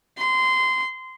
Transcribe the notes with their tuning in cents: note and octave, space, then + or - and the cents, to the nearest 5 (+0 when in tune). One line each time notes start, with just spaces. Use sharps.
C6 -20